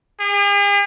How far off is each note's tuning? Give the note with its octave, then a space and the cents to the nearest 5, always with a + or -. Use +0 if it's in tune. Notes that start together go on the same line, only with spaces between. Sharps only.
G#4 -45